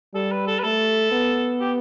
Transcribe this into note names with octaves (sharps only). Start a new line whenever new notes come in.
G3 A4
B4
A4
B4
A3 A4
B3
G4